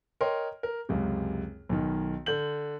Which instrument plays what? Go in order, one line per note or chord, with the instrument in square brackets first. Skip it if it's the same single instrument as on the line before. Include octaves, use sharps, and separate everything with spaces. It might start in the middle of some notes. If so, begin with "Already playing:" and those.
[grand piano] A#4 C#5 D#5 G5 C6
A#4
C#2 F#2 C3
B1 D#3
D3 G6 F#7